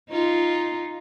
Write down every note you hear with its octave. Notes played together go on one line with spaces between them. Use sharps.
D#4 F4